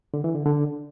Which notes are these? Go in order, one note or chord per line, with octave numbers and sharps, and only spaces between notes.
D3
E3
D3
D3